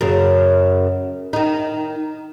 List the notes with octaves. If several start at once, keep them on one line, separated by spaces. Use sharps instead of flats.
F#2 C#3
D#3 D#4